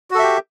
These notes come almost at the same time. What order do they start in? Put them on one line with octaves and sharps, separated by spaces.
F#4 A4 E5 G4